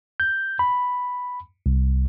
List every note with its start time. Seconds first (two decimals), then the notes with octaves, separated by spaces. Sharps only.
0.20 G6
0.59 B5
1.66 C2